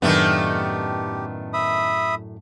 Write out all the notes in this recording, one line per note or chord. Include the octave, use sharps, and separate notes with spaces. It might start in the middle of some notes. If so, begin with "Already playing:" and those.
F#2 A2 D#3 A3 B3 D4 G4
E5 B5 D#6